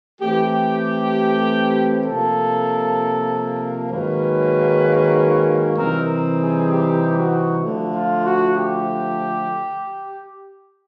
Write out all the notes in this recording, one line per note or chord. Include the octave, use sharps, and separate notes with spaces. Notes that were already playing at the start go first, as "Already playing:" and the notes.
E3 A3 C4 G4
C3 F3 A#3 A4
G#2 D#3 F#3 A#3 C#4 B4
C3 E3 G3 C4 D#4 A#4
G#4
G4
F#4
D3 F3 A3
F4
F#4
G4